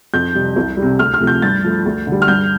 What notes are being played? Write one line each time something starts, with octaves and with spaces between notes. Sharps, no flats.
F2 G6
C3 G3
C2
G3
C3
D2 F6
F6
C3 F3 A3
G6
G2 A6
F3 A3
D2
D3
G3
F6
G2 G6